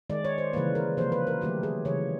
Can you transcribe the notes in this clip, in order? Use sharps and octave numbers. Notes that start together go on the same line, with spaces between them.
D#3 G#3 D5
C#5
C5
C#3 E3 G3 A#3 B4
A#4
C3 F3 A#3 C5
B4
A#4
D#3 F#3 A3 G4
G#4
C#3 E3 G3 C#5